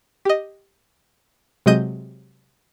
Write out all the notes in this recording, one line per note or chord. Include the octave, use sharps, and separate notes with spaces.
G4 D#5
C3 F#3 G#3 D#5 G6 D#7